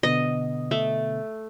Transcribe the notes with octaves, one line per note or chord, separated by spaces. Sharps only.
B2 D3 B3 D#5
A3